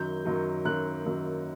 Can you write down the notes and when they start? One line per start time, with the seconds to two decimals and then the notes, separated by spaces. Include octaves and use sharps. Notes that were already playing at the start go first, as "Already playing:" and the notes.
Already playing: F#2 D#3 F#3 G6
0.25 F#2 D#3 F#3
0.65 F#2 D#3 F#3 F#6
1.06 F#2 D#3 F#3